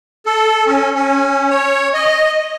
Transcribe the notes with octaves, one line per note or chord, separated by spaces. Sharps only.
A4
C#4
C#4
C#5
D#5